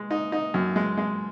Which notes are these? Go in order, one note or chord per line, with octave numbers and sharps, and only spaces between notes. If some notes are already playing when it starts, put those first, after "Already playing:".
Already playing: G#3
D#4
D#4
F#2
G#3
G#3